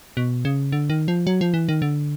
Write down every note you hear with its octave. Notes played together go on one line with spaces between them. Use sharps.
B2
C#3
D3
D#3
F3
F#3
F3
E3
D#3
D3